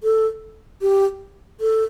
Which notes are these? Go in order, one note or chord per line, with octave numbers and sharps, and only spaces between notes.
A4
G4
A4